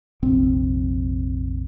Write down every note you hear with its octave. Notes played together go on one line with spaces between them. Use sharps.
F1 A#1 C4